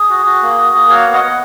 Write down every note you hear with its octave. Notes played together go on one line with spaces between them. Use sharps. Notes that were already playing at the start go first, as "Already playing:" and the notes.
Already playing: G#4
F#4
F#4
A#3
F#4
A#3
F#4 C#5 F5
B3
D#5 F#5
B3